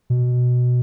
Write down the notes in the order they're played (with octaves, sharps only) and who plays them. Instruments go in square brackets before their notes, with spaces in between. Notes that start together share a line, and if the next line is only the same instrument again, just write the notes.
[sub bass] B2